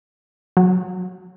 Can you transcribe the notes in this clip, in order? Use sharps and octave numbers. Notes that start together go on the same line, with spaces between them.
F#3